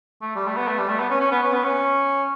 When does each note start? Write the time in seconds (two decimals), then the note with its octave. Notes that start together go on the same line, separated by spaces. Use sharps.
0.22 A3
0.36 G3
0.46 A3
0.57 B3
0.68 A3
0.78 G3
0.89 A3
0.99 B3
1.10 C#4
1.20 C#4
1.31 B3
1.43 C#4
1.53 B3
1.64 C#4